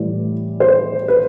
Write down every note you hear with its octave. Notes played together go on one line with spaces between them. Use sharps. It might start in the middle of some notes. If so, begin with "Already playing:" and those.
Already playing: A2 E3 G3 D5
C5
B4